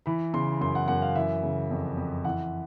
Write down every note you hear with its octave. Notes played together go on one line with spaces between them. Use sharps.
E3 B5
C#3 C6
F#2 C6
F#5
F#2 F#5
F5
E3 E5
C#3
F2
F2
E3 F#5